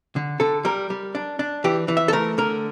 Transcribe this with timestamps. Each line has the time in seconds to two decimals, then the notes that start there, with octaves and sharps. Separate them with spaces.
0.16 D3
0.40 D3 A4
0.65 G3 A#4
0.90 G3
1.15 D4
1.39 D4
1.64 E3 G4
1.88 E3
1.97 E5
2.08 A4
2.13 A3 A#4
2.38 D3 A#4